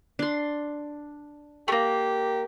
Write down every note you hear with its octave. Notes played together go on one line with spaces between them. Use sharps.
D4 C6
A3 A#3 G4